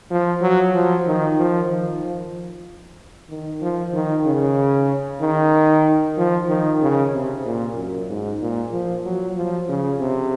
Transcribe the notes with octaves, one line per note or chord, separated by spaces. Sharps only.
F3
F#3
F3
D#3
F3
D#3
F3
D#3
F3
D#3
C#3
D#3
F3
D#3
C#3
C3
A#2
F#2
G#2
A#2
F3
F#3
F3
C#3
C3